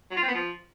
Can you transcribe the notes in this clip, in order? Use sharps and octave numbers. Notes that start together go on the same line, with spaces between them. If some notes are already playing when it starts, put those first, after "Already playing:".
F#3
F4
C4
B3
F3